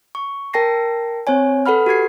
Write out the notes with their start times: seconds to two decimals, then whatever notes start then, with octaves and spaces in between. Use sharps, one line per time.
0.15 C#6
0.53 A#4 G5 A5 A#6 C7
1.27 C4 C5 C#5 G#5
1.66 A4 B4 F#5 B5 F6
1.86 F#4 G4 G#6 C7